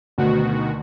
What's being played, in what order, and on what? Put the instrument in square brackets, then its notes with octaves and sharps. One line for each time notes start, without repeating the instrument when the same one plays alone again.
[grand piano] D2 [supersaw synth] B2 D#3 F#4